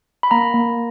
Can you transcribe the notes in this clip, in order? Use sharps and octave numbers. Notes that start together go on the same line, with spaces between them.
B5
A#3 A#5
A#3